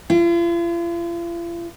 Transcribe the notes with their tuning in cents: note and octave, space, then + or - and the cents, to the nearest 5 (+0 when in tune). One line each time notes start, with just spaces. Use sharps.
F4 -45